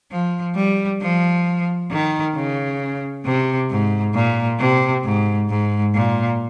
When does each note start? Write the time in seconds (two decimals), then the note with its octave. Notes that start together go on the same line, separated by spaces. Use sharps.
0.11 F3
0.56 G3
1.01 F3
1.91 D#3
2.35 C#3
3.25 C3
3.70 G#2
4.14 A#2
4.59 C3
5.04 G#2
5.50 G#2
5.94 A#2